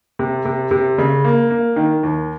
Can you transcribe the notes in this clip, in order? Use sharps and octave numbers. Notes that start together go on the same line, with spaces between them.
C3
C3
C3
C#3
A#3
A#3
D#3
D#2